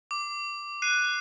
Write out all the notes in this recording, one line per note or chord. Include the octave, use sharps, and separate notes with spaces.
D6
F#6 C7 D#7